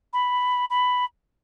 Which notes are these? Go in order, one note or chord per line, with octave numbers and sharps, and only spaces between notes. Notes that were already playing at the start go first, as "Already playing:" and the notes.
B5
B5